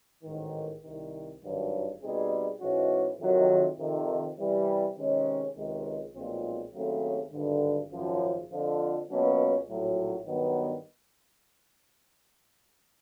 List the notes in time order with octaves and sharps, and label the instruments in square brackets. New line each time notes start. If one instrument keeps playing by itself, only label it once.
[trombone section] A1 G#2 D#3
C2 C3 D#3
G#1 G2 D#3 F#3
B2 G3 C4 D#4 G#4
G#2 E3 G#3 C#4 F#4
F2 C3 D#3 F#3
F2 C3 D#3
C3 E3 G3
C3 D#3 G#3 C#4
C#2 C3 D#3 G#3
B1 A#2 F3 G#3 C4
D#2 C#3 F#3 A3 C4
G#1 G2 D3
G#1 F#2 C#3 F3
F2 D3 F3
C#2 B2 F#3 A#3 C#4
A#1 A2 F#3
G2 D#3 F#3 B3